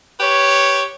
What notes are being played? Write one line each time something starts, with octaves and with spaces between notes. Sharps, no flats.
G4 B4 C#5